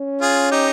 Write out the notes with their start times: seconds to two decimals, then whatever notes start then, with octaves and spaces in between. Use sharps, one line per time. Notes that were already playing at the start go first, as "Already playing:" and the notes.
Already playing: C#4
0.21 F4 G#4
0.51 D#4 G4